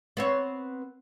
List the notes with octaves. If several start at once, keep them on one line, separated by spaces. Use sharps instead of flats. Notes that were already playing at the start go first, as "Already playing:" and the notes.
B3 C4 C#5